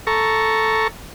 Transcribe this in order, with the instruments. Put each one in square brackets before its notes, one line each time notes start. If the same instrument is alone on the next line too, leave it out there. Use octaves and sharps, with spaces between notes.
[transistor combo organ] A4 A#5 C#6